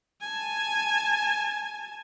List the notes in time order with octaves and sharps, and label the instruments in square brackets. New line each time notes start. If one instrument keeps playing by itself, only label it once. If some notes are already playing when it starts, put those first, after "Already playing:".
[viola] G#5 A5